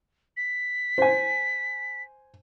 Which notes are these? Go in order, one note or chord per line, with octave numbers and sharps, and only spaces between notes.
B6
C5 G#5